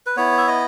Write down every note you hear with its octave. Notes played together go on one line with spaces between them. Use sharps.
B4
B3 E4 C#5
E5
D#5